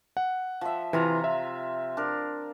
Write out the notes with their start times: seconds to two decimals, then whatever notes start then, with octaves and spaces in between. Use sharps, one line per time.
0.17 F#5
0.61 F3 E5
0.93 C3 E3 F4 A#5
1.24 E5
1.97 D4 A#4